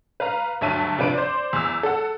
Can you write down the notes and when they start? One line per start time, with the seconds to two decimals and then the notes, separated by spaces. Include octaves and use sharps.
0.20 B4 F5 A#5
0.61 D2 G2 F#3 E5 A5 D#7
0.98 C3 F3 D4 B4 D7
1.14 C5 D5
1.53 E2 E6
1.83 A4 F#5